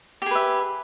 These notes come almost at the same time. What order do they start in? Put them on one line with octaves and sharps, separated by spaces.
G4 G#4 B4 E5